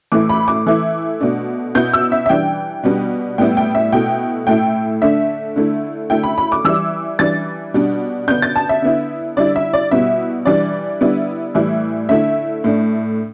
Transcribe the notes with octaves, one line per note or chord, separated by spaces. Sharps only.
A2 E3 A3 E4 D6
B5
D6
E3 A3 E4
B2 A3 D4
B2 B3 E4 G6
E6
E5
E5
E3 G3 D4 G5
B2 G3 B3 D4
A2 G3 B3 E4 G5
G5
E5
B2 A3 E4 G5
A2 A3 E4 G5
D3 A3 D4 E5
D3 A3 E4
D3 A3 E4 G5
B5
B5
D6
E3 G3 E4 E6
E3 G3 D4 A6
B2 G3 D4
D3 B3 D4 G6
A6
A5
E5
D3 B3 E4
D3 G3 E4 D5
E5
D5
B2 G3 B3 E4 E5
E3 G3 D4 D5
D3 G3 B3 E4
A2 E3 G3 E4
D3 A3 E4 E5
A2 A3 D4